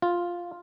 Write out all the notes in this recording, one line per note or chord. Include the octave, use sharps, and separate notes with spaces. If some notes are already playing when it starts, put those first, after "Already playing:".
F4